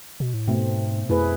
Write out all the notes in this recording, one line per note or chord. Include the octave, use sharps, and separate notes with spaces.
B2
A2
G#2 B2 A3 C4
F2 A3 E4 G#4 B4